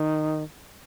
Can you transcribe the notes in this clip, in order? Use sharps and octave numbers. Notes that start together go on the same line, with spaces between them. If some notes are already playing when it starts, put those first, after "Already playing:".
Already playing: D#3